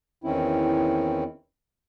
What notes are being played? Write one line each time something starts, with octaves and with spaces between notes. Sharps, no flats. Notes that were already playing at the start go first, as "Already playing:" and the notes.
E2 D#3 C4 C#4 E4